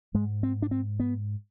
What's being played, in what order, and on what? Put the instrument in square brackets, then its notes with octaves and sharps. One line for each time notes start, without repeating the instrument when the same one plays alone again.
[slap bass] G#2 G#3
C4
D4
C4
B3